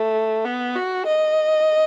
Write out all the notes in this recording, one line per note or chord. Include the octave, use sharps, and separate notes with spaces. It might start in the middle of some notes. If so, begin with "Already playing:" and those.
Already playing: A3
B3
F#4
D#5